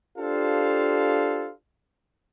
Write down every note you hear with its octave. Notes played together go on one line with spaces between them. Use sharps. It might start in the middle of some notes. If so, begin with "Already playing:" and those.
D4 F4 G4 A4 C5 F5